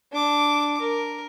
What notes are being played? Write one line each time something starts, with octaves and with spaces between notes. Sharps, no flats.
D4 D6
A#4